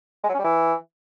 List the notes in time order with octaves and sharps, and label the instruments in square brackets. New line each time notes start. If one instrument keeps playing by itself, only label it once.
[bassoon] G#3
F#3
C#4
G3
E3